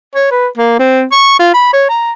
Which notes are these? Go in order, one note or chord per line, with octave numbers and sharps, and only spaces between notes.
C#5
B4
A#3
C4
C#6
F4
B5
C#5
A#5